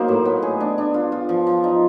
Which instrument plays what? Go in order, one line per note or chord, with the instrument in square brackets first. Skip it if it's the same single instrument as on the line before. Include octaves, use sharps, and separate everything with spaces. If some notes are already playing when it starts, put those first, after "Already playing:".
Already playing: [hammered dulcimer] F#3 A#3 D#4 C5
A2
B3
G#4
D4
D4
F4
F4
F3
F3
D#4